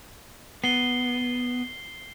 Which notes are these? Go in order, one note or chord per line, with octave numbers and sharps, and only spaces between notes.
B3 C7 G7